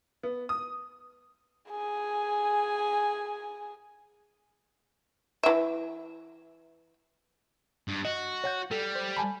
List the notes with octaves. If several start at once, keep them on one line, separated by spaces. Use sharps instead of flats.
B3
D#6
G#4 G#5
E3 E5
G2
F#4 D#5
C#5 F#5 G6
G3 A4
C5
G#5 A5 B5